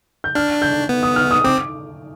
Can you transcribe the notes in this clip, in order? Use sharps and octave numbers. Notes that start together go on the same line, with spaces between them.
G6
D4 F6
G6
B3
D#6
F6
D#6
C4 D6